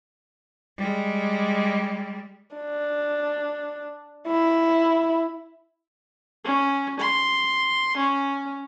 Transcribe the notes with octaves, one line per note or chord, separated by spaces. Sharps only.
G3 G#3
D4
E4
C#4
C6
C#4